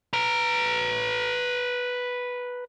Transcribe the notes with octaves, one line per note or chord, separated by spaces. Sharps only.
B4 A#5